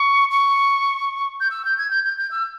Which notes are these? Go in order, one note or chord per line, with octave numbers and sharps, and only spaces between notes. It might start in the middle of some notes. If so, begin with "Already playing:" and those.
Already playing: C#6
C#6
G6
E6
G6
G#6
G6
G6
G6
E6